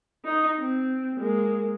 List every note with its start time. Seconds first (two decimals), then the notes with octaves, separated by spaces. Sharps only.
0.25 D#4 D#5
0.59 C4
1.20 G#3 A#3